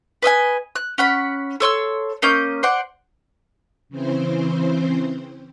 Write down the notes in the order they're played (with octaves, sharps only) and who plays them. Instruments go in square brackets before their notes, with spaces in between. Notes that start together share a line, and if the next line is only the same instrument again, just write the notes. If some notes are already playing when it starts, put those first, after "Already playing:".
[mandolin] B4 D#5 E5 G#5
F#6
C#4 F#5 B5
A4 C#5 C6 E6
A#3 C#4 D#5 G6
C5 D5 F#5
[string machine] C#3 E3 C4 C5